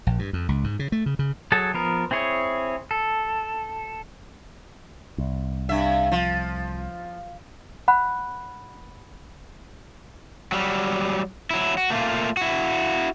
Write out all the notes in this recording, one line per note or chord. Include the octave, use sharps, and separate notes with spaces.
A#1
G2
F2
C#2
G#2
C#3
A3
C#3
C#3
F#3 G#4 A4 A5
F3 B3 A#4
C4 E4 G#4 C#5
A4
C2
G2 E5
F3
F#5 B5 F#6
F#3 G3
F#3 E4
F#4
A3 A#3 F4
E4 F#4